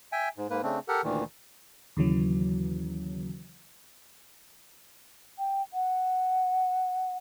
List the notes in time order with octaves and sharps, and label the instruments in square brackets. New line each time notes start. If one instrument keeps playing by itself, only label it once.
[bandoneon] E5 G5 G#5
G#2
G#2 A#3 B4
C#3 A3 C4 D4
G4 A4 A#4 F#5
D2 A#2 D#3 E3
[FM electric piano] D#2 C#3 E3 F#3
[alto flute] G5
F#5